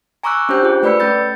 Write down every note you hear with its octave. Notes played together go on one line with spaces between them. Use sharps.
G#5 A#5 C#6 D6 E6 F#6
C#4 D4 G4 C5 F#6 G6
F4 G#4
A3 B4 D5 B5 E6 C#7
A3 C#4 G6 A6